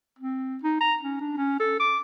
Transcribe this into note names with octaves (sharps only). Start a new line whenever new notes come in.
C4
D#4
A#5
C#4
D4
C#4
A4
D6